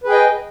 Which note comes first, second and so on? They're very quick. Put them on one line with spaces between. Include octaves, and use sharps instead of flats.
B4 G#4 G5 D#5